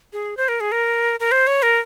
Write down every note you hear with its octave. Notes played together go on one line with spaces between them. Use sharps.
G#4
C5
A#4
G#4
A#4
A#4
C5
C#5
A#4